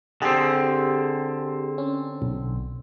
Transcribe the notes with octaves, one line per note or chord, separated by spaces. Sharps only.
D3 C4 G4 G#4
C#4
B1